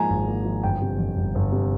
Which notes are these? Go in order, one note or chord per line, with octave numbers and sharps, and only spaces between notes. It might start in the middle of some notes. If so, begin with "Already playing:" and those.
Already playing: G#2 F3 A#3 G#5 A#5
G#1
A#3
F3
G1 G5
C3
F2
G1
G1
C3